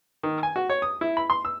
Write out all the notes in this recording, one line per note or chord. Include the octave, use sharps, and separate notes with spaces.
D#3
G#5
F#4
C#5
D#6
E4
B5
C6
E6